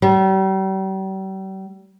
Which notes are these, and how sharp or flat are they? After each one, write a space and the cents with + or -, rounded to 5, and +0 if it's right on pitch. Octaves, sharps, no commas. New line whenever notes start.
G3 -40